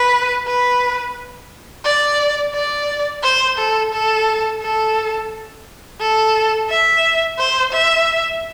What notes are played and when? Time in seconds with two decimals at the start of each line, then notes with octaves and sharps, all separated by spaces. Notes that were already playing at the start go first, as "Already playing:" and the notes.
Already playing: B4
0.47 B4
1.85 D5
2.54 D5
3.23 C5
3.58 A4
3.93 A4
4.62 A4
6.00 A4
6.70 E5
7.39 C5
7.73 E5